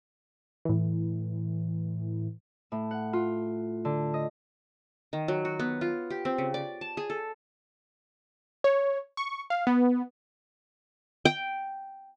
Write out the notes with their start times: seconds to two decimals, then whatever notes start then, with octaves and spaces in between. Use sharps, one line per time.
0.65 A2 E3
2.72 A2
2.91 F#5
3.13 F4
3.85 D3
4.14 D#5
5.13 D#3
5.28 F#3
5.45 F#4
5.59 B3
5.81 F4
6.10 G4
6.25 C4
6.38 C#3
6.54 D5
6.81 A5
6.97 G#4
7.10 A4
8.64 C#5
9.17 C#6
9.50 F5
9.67 B3
11.25 G5